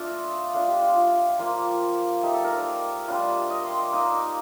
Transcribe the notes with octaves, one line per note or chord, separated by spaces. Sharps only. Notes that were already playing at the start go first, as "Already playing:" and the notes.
Already playing: A3 D4 F4 D#5
A3 D4 F4 F5
G4
F4
F4
F3 A#3 F4
A3 D#4 G4
A4
A#4
D5
G3 D4 F4
D#5
C6
D6
A#3 D#4 D#6